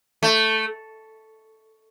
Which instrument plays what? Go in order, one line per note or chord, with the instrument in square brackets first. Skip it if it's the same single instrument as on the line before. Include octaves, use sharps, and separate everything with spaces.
[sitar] A3